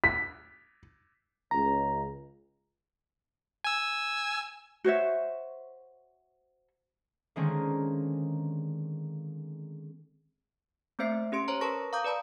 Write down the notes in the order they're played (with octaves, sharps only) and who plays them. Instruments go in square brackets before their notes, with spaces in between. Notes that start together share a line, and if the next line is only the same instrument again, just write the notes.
[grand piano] B6
[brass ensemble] C#2 [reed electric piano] A#5
[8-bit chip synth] G#5 E6
[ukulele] F#4 C5 C#5 E5
[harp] D3 D#3 G#3 A#3 C4 C#4
[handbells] A3 A#3 C4 C5 E5 C7
C#4 G4 C6 D7
C5 C#5 A#5
A#4 B4 A5 C#6 A#6
F5 A#5 D6 D#6 G6
B4 D5 A5 B5